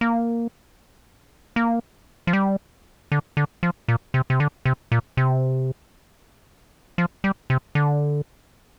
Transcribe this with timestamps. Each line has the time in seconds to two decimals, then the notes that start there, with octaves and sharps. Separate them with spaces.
0.01 A#3
1.56 A#3
2.27 F3
2.33 G3
3.12 D3
3.37 D3
3.63 F3
3.88 A#2
4.14 C3
4.30 C3
4.40 D3
4.65 C3
4.92 A#2
5.17 C3
6.98 F3
7.24 G3
7.50 C3
7.75 D3